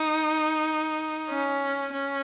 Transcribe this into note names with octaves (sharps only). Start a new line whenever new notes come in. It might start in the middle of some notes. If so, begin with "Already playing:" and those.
Already playing: D#4
C#4
C#4